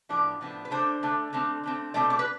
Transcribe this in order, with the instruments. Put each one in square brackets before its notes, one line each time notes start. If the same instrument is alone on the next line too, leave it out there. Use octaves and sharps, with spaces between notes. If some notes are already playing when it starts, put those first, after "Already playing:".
[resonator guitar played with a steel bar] A2 F3 B3 D4 D5
A2 F3 B3 D4
B4
D3 A3 D4 C5
D3 A3 D4
D3 A3 C4
D3 A3 C4
B2 A3 C4 D5
D5
B4